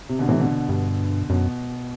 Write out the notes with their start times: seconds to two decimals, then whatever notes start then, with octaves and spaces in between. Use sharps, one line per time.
0.09 C3
0.19 B2 D3
0.29 A2 C3 E3
0.39 B2 D3
0.69 G2
1.30 F#2 B2